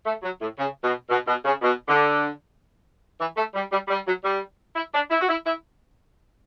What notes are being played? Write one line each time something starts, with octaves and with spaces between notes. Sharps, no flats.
A3
F#3
A2
C#3
B2
B2
B2
C#3
B2
D3
E3
A3
G3
G3
G3
F#3
G3
E4
D4
E4
F#4
E4
E4